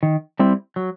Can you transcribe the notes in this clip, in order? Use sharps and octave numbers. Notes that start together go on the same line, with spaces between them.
D#3
G3 C4 E4
F#3